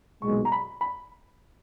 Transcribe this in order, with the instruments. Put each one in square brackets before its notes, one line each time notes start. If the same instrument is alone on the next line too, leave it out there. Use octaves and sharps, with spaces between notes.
[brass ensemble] B1 A#2 G#3 [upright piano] C#6
[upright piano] A#5
B5
B5